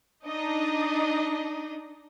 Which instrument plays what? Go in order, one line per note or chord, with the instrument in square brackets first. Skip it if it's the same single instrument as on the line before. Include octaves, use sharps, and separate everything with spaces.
[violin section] D4 D#4 D#5